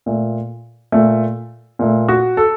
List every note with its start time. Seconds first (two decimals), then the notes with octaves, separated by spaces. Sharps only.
0.06 A#2 A3
0.92 A#2 A3
1.79 A#2 A3
2.09 F#4
2.37 A4